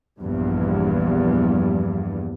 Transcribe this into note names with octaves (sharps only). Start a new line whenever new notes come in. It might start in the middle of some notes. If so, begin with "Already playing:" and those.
A#1 E2 G2